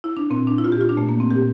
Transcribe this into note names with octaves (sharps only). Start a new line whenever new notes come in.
E4
D4
A#2 C4
D4
E4
A#2 F4
G4
F4
D4
A#2 A3
A#3
C4
A#2 G4